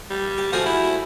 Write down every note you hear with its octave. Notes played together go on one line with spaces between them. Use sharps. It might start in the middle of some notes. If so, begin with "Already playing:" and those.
G3
G4
F3 A3 F#4 G#4
E4